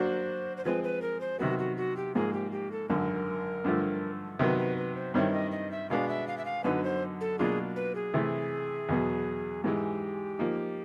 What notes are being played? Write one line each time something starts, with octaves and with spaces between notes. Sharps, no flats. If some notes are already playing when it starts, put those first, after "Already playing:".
Already playing: F#3 A#3 D4 F#4 C5
C5
F3 G#3 C4 B4
B4
A#4
C5
C3 D#3 F#3 B3 F#4
F#4
F#4
G4
G#2 F3 A#3 G#4
G4
G4
A4
G#1 F#2 D3 A#4
G2 D3 F3 A3
C3 D#3 F#3 B3 B4
B4
B4
C5
G2 D#3 G3 C4 E4 C#5
D#5
D#5
E5
B2 G#3 B3 D4 F5
E5
F5
E5
F5
F#2 D3 F#3 B3 D#4 B4
C5
A4
B2 F#3 A#3 D4 F4 G#4
B4
G#4
C3 E3 A3
E2 B2 F#3 B3
G#2 E3 G#3 G4
F3 A#3 D#4